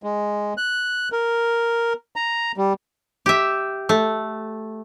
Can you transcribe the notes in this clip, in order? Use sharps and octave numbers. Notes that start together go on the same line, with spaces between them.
G#3
F#6
A#4
A#5
G3
G4 E5
A3